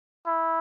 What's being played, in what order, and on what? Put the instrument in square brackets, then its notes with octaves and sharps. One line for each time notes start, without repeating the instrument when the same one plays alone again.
[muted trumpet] E4